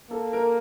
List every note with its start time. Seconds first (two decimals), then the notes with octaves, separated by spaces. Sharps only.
0.10 A#3 A4
0.33 A#4